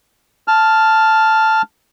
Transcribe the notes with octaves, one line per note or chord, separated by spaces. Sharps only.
A5 F6